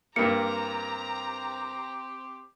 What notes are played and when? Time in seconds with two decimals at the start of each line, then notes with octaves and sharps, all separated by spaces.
0.16 G2 A#3 C4 G4 A#5 C#7